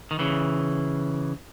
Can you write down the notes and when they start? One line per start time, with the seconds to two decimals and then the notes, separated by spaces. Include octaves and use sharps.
0.11 D#3
0.19 C#3 E3